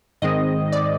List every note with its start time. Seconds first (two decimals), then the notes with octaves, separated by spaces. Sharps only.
0.22 G#2 D#3 G#3 C4 D#5
0.72 D5